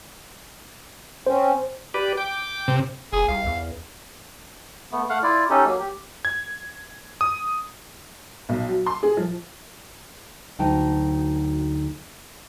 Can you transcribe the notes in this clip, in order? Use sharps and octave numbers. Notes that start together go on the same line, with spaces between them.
C4 C#4 C5
G4 B4 D5
G5 D6
C3
F1 G#4
C2 F5
E2
A3 B3
A3 F5 F#5
E4 F4 D5
C#4 D#4 G4 A4
F#3 A#3
G4
G#6
D#6
B1
F#3
C6
G#4
F3
D2 F#3 D#4 G5 A5